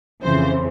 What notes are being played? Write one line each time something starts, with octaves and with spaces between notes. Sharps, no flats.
F2 C#3 E3 C5